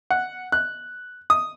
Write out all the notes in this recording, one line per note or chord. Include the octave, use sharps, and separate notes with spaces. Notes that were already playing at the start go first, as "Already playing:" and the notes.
F#5
F#6
D#6